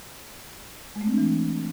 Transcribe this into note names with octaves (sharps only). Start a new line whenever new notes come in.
G#3
A3
C4
D4
E3